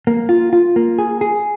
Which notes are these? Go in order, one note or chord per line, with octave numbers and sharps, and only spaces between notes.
A#3
F4
F4
A#3
G#4
G#4